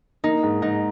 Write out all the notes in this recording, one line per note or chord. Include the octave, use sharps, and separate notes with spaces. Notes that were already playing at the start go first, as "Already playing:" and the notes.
A#3 D#4
G#2
G#2 D#4